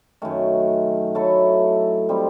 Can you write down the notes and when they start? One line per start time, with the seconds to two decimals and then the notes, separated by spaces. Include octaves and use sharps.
0.22 F#2 D#3 A3
1.15 F#3 A3 E4 A4
2.09 G3 C4 D#4